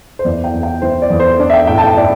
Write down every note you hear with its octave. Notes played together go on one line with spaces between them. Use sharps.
C5
E2 D5
G5
E2
G5
E3 C5
D5
E2
C5
D4 D5
E5
G5
A2 G5
A5
G5
A2 D5